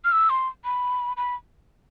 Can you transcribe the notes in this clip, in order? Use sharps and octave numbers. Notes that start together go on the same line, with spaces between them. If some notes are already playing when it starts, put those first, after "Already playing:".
F6
E6
C6
B5
B5